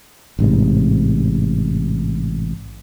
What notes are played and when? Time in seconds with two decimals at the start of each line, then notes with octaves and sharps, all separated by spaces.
0.39 A1 G#2 C3